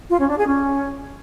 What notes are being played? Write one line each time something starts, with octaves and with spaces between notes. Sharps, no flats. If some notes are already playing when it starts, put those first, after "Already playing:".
F4
C#4
D4
G#4
C#4